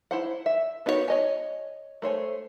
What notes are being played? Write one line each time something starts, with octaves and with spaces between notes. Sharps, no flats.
E4 C5 F#5
E5
B3 D#4 F#4 G#4 C#5
C#5 D#5 G#5
A3 C5 C#5 G#5